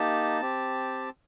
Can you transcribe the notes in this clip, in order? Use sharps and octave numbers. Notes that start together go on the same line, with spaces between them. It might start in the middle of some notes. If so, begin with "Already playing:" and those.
Already playing: A#3 D#4 G4 A5
C4 G4